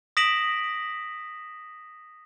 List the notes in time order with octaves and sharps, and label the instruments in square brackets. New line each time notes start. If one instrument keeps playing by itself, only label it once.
[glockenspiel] D#6 A#6 B6 D7 E7 F#7